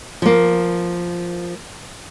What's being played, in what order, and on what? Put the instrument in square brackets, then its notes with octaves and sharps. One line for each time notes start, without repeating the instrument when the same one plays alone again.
[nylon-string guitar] F3 A#3